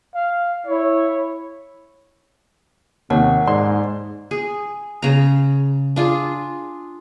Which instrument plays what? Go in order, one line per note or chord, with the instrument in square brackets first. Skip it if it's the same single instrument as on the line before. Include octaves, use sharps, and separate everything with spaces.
[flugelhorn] F5
[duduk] E4 [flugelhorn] C#5
[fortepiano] D#2 [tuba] C3 [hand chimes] A#4 C#5 F#5
[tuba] G#2 [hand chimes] D5 [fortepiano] C6
[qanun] G#4
C#3 A#5
D4 F4 G#4